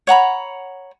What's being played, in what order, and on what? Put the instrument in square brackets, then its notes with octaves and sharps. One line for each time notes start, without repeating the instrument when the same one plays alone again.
[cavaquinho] C#5 F#5 A#5 B5